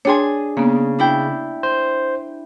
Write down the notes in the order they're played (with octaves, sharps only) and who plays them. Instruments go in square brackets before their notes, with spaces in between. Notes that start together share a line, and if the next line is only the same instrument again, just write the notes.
[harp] D4 G#4 G#5 [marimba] C#5 G5 C6
[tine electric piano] C#3 [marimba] A#3 B3
[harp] D4 E4 G5
[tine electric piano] C5